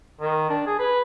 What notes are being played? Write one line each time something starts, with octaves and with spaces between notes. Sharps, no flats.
D#3
D4
G#4
B4